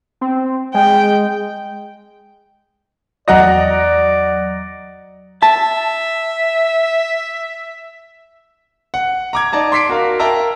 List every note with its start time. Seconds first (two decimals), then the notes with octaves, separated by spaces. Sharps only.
0.21 C4
0.74 G#3 G5
3.28 E2 F#3 D5 D#5 F#5 A#5 A#6
5.43 E5 A5
8.94 F#5
9.33 A#5 D6 G#6
9.52 D#4 D5 A5 A#5
9.72 C6 D6 B6 C7 D7
9.89 F#4 A#4 F5
10.19 A#4 E5 G5 A5 A#5 E6